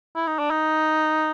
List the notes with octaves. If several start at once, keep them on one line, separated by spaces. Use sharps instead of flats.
E4
D#4
D4
D#4